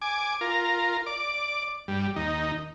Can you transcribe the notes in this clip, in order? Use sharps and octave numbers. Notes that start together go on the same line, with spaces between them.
G#5 D6
F4 A#4
D5 D6
G2 G3
D#2 D#4